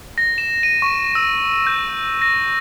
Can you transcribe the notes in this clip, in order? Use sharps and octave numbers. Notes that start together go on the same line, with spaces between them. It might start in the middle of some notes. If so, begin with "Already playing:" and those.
A#6
E7
D#7
C#6
E6
G6
A#6